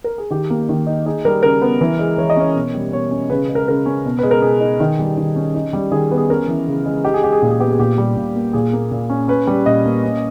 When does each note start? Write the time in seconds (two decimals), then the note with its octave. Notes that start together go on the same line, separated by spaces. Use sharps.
0.04 A#4
0.18 G#4
0.30 D#3 G4
0.50 A#3
0.69 D#3
0.87 D#4
1.06 D#4 G#4
1.25 G3 A#4
1.43 C#3 A#4
1.62 B3
1.81 E3
1.99 G#3
2.18 E3 C#5
2.30 D#5
2.36 C#4 C#5
2.55 B2
2.74 G3
2.92 B2 C#5
3.11 C#4
3.30 C#3 B4
3.49 G#3
3.55 A#4
3.67 C#3 A#4
3.86 C#4
4.06 B2
4.19 G#3 B4
4.31 A#4
4.42 B2 G#4
4.61 D#4
4.80 D#3
4.99 G3
5.17 D#3
5.36 C#4
5.55 D#4
5.73 G3
5.91 D#3 G#4
6.11 B3
6.18 G#4
6.30 C#4 A#4
6.48 E3
6.67 C#3
6.86 G#3
7.04 D#4 G4
7.14 G#4
7.23 G#3 G4
7.33 G#4
7.42 A#2 G4
7.51 G#4
7.60 B3 G4
7.71 G#4
7.79 A#2 G4
7.98 G3
8.17 A#2
8.35 A#3
8.53 A#2 G#4
8.73 A#3
8.92 A#2
9.10 C#4
9.28 C#4 B4
9.47 G3
9.66 A#2 D#5
9.85 A#3
10.03 C#4